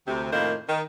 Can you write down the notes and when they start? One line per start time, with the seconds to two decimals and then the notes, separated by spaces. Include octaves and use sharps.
0.07 D2 C3
0.33 F2 A2 D#3 A#3 C5
0.69 D#3